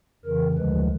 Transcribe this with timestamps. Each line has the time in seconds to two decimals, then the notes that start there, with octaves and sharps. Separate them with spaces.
0.25 F2 C#3 E3 A#4
0.57 D2 D3 F3 G#3 B4